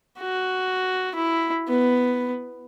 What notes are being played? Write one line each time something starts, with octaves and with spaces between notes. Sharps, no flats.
F#4
E4
B3